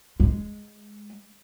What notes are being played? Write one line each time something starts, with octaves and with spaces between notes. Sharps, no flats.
G#3